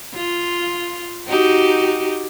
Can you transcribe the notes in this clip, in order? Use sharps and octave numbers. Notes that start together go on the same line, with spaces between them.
F4
D#4 F#4 G4